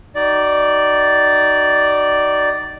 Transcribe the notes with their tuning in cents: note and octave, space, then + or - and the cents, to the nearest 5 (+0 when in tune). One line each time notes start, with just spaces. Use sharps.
D#4 +0 F#4 +40 D5 +0